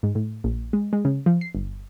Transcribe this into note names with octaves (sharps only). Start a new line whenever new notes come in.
G#2
A2
A#1
G#3
G#3
C#3
F3
C7
G1